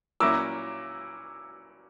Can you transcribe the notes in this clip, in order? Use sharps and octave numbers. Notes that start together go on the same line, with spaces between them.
A#2 F#3 A#3 C#4 E4 D6 E6